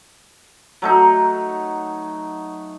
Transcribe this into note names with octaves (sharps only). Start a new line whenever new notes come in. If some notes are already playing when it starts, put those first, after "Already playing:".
F#3 A3 D#4